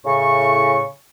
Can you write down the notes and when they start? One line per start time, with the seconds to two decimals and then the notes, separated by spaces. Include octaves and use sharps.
0.05 A2 C#3 C#6